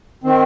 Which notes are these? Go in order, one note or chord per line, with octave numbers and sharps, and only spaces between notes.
D#3 C4